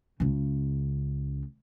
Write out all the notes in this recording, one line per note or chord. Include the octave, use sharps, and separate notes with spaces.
C#2 C#3